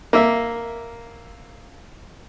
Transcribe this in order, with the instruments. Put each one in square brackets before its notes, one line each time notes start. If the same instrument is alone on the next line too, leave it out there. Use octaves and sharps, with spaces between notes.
[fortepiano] A#3 E5